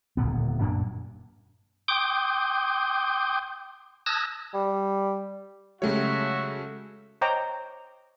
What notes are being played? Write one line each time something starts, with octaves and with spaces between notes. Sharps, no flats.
D#1 A#2 D3 B3
F#2 A#2 A#3 D4
G5 C6 D6 D#6 G6
A5 D#6 E6 F#6 G#6 A#6
G3
C#3 F#3 G#3 A3 F#4 G4 C#5 E5
C5 C#5 D#5 G5 A#5 D6